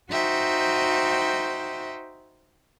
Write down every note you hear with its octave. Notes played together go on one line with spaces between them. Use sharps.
D#4 F#4 C5 E5 G5